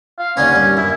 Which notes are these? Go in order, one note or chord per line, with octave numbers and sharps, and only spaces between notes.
F5
D#2 D3 B3 C#4
G2
F#2 E4